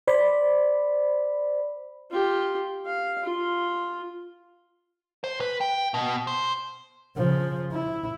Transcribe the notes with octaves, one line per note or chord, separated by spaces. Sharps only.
C5 D5 B5
F4 G4
F5
F4
C5
B4
G5
B2
C5
C#3 F3
E4